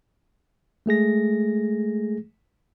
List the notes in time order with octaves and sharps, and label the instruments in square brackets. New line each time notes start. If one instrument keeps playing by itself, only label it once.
[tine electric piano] G#3 A3 G#4 A#6